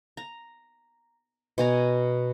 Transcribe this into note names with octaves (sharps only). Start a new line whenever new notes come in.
A#5
B2 G#5 A#5